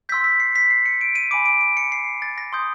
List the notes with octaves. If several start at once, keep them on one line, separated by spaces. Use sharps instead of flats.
C6 E6 G6 B6
B6
C7
B6
C7
C#7
D7
D#7
G#5 B5 D6 D7
D7
D7
C#7
C7
A6
A#6
C6 D#6 G6